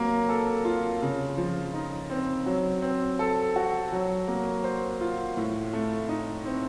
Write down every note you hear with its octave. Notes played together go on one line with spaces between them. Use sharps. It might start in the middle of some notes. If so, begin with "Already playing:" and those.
Already playing: F#3 A#3
A4
F4
C#3
F3
D#4
C4
F#3
C4
A4
F#4
F#3
A#3
C5
F4
A2
A3
D#4
C4